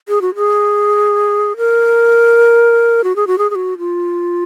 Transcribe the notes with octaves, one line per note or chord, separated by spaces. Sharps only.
G#4
F#4
G#4
A#4
F#4
G#4
F#4
G#4
G#4
F#4
F4